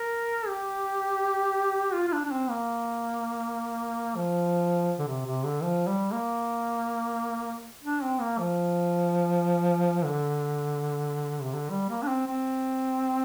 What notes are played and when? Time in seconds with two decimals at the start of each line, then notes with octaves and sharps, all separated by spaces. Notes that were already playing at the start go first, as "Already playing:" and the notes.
Already playing: A#4
0.47 G4
1.94 F4
2.08 F4
2.12 D4
2.25 D4
2.31 C4
2.50 A#3
4.16 F3
4.98 D3
5.07 C3
5.25 C3
5.45 D3
5.63 F3
5.87 G3
6.12 A#3
7.84 D4
8.03 C4
8.21 A#3
8.39 F3
10.04 D3
11.42 C3
11.53 D3
11.70 G3
11.90 A#3
12.02 D4
12.08 C4
12.27 C4